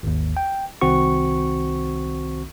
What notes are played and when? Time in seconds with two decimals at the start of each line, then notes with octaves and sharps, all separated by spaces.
0.03 G#1 D#2
0.37 G5
0.81 C2 D#3 C4 F#4 C#6